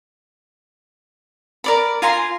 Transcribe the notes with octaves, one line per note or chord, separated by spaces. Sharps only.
A#4 D5 B5
F4 G#5 A#5 C6